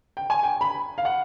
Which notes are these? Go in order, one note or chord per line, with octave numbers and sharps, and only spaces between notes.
G5
G#5
G5
B5
F5
F#5